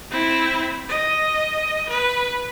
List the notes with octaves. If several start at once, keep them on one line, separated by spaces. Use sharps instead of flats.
C4 E4
D#5
B4